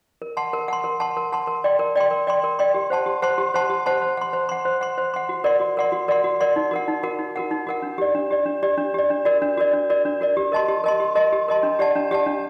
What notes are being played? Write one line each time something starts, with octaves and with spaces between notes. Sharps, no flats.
A#4
F#5 A5 C6
A#4
F#5 A5 C6
A#4
F#5 A5 C6
A#4
F#5 A5 C6
A#4
D5 G5 C6
A#4
D5 G5 C6
A#4
D5 G5 C6
A#4
D5 G5 C6
G4
C5 F#5 A5 C6
G4
C5 F#5 A5 C6
G4
C5 F#5 A5 C6
G4
C5 F#5 A5 C6
C5
F#5 C6
C5
F#5 C6
C5
F#5 C6
C5
F#5 C6
F#4
A#4 D5 F#5 C6
F#4
A#4 D5 F#5 C6
F#4
A#4 D5 F#5 C6
F#4
A#4 D5 F#5 C6
D#4
F#4 A#4 F#5
D#4
F#4 A#4 F#5
D#4
F#4 A#4 F#5
D#4
F#4 A#4 F#5
D4
G4 D5
D4
G4 D5
D4
G4 D5
D4
G4 D5
D4
F#4 A#4 D5
D4
F#4 A#4 D5
D4
F#4 A#4 D5
D4
F#4 A#4 D5
G4
A#4 D#5 A5 C6
G4
A#4 D#5 A5 C6
G4
A#4 D#5 A5 C6
G4
A#4 D#5 A5 C6
D4
G4 D5 F#5 A5
D4
G4 D5 F#5 A5
D4